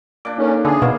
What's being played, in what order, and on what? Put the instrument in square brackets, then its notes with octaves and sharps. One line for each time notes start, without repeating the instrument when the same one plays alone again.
[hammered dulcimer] A#2 D4 [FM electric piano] D6
[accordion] C#4 [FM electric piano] D#4 A4 A#4
[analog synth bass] D3 [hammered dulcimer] E3 [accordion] G#4
[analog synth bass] B2 [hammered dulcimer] A#3 [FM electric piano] F5 C6 E6